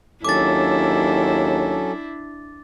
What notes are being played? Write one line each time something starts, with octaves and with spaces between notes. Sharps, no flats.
D#2 F#3 C#4 D4 E4 A4 D6 A6